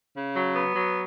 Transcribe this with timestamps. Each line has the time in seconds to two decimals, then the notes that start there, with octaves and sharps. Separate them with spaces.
0.15 C#3
0.36 F#3
0.55 B3
0.76 F#3